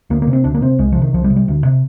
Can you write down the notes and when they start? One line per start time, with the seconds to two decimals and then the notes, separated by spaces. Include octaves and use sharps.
0.10 D2 A#3
0.22 A#3
0.27 C3
0.33 C4
0.44 D2 D4
0.54 A#3
0.62 C3 C4
0.79 C2 G#3
0.92 C3 F3
1.01 D#3
1.14 C2 F3
1.24 G3
1.30 C3
1.36 G3
1.48 D2
1.65 C3